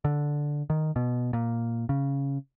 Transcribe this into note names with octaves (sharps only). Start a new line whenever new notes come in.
D3
D#3
B2
A#2
C#3